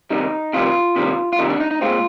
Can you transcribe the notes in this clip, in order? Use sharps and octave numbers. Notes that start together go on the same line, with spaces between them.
C3 D#3 G3 D#4
C3 D#3 G3 F4
C3 D#3 G3
F4
C3 D#3 G3 D#4
D4
D#4
D#4
A#2 G#3 C4 F4